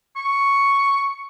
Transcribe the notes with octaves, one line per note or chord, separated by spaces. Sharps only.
C#6